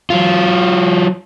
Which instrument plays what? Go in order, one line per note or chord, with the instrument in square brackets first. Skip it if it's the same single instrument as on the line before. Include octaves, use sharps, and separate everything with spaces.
[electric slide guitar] F#3 F4